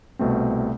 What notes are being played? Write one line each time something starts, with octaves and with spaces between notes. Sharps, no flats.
C2 B2 A3 C4